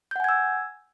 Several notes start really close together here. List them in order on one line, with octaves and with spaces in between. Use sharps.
G6 F#5 G#5 G#6 E6